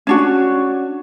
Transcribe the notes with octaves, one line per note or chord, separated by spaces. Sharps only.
C#4 D4 F#4